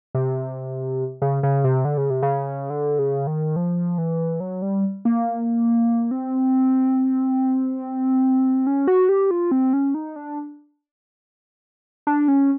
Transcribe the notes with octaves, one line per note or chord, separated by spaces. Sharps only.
C3
C#3
C#3
C3
D3
C#3
C3
C#3
D3
C#3
D#3
F3
E3
F#3
G3
A#3
C4
C#4
F#4
G4
F4
C4
C#4
D#4
D4
D4
C#4